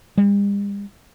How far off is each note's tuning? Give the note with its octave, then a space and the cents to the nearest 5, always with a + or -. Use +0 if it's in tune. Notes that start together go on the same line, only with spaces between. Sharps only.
G3 +45